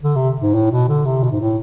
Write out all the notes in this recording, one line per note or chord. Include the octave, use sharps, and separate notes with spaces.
D3
C3
G#2
A2
B2
D3
C3
B2
G#2
A2